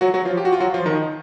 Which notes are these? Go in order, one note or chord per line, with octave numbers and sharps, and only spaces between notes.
F#3 F#4
F#3 F#4
F3 F4
G4
F#4
F4
F#3 F#4
F3 F4
D#3 D#4